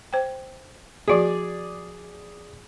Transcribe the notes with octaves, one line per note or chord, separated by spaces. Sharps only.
C5 G5
F3 F#4 G#4 D5 D#5